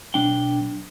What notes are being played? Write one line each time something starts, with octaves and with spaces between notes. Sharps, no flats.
B1 D4 G5